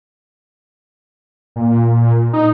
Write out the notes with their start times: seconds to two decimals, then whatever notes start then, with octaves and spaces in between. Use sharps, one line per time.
1.56 A#2
2.33 D#4